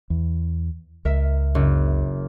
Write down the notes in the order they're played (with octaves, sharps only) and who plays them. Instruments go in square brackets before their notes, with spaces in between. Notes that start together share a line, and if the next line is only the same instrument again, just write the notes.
[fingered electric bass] E2
[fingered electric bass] C#2 [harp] A#4 E5
[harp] F#1